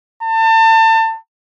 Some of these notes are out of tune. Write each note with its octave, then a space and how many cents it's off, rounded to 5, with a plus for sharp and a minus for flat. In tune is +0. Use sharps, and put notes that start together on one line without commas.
A5 +30